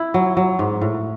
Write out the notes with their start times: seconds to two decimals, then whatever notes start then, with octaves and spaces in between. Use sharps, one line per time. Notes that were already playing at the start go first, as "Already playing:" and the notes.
Already playing: E4
0.14 F#3
0.37 F#3
0.59 G#2
0.81 A2